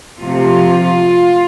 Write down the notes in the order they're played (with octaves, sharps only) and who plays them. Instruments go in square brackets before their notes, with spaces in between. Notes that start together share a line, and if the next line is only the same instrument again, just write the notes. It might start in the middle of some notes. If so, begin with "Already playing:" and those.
[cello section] C3 F3 A3 F4